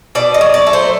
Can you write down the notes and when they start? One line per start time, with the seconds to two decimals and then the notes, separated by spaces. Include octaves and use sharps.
0.15 B2 D5
0.34 D#5
0.41 F#3
0.54 D5
0.67 A3
0.73 C5